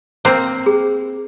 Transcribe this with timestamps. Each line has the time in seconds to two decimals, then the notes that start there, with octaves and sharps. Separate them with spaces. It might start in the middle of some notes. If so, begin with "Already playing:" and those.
0.25 A#3 C4 C5
0.66 G#4